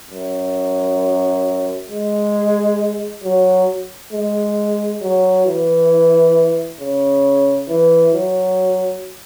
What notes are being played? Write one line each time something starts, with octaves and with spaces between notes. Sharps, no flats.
F#2
G#3
F#3
G#3
F#3
E3
C#3
E3
F#3